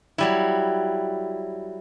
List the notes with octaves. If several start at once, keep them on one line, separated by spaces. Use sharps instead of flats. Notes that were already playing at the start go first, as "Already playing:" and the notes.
F#3 G3 E4